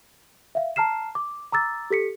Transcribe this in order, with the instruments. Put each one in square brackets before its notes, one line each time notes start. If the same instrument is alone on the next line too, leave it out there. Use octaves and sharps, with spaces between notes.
[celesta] E5 F5
A5 A#5 F6 C7 E7
D6
A#5 D6 E6 A6
G4 A4 B6 C#7